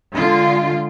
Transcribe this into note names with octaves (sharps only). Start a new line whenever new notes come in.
D3 G#3 F4